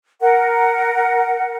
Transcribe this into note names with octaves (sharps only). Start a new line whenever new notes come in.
A#4 F#5